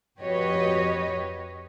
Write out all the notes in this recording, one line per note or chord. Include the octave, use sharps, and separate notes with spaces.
F2 F#4 G4 B4 C#5 D#5